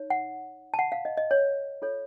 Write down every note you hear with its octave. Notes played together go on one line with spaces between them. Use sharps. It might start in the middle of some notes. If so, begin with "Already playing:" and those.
Already playing: D#4 C#5
F#5
A5
F#5
F5
D#5
D#5
C#5
F4 A4 C#5